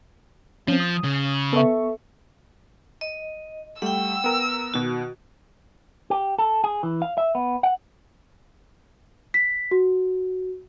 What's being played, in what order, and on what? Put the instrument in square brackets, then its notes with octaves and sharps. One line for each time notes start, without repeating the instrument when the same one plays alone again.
[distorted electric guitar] F3 [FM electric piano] C4 C#4
[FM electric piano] D#6
[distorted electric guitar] C#3
[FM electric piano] B3 C#6 [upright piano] A4 E5
[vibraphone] D#5
[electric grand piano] G3 A3 [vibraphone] F#5 G5 [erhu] E6
[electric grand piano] B3 A#4
[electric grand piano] B2 D#3 [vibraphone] F#4
[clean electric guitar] G4
A4
G#4
E3
F5
E5
B3
F#5
[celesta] B6
F#4